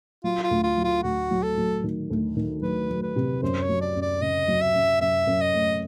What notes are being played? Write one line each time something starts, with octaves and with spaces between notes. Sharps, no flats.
F#3 F4
F4
D2
F4
F#3
F4
D2 F#4
F#3
A4
F#3
D#3
D2
D#3
F#3 B4
F#3
B4
C3
F#2 C5
C#5
F#3
D5
F#2
D5
C#3 D#5
F#3
E5
F#2
F#2 E5
F#2
D#5
A3